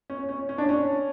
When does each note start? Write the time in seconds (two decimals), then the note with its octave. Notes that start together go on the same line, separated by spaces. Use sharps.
0.10 C#4
0.29 C#4
0.49 C#4
0.58 D4
0.69 C#4